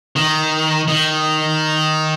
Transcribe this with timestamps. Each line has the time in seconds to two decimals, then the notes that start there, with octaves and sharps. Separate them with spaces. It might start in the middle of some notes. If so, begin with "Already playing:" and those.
0.16 D#3
0.88 D#3